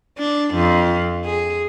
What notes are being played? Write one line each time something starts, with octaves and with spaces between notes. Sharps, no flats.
D4
F2
G#4